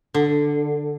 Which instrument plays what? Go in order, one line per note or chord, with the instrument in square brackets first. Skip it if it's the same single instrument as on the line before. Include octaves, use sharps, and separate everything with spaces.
[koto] D3